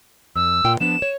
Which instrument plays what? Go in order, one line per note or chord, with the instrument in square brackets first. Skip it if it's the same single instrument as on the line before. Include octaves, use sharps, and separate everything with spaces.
[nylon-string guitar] F2 [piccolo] E6
[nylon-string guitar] A#2 F4 G5
[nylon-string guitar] F3 B3 D4 [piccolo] E7
[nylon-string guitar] C#5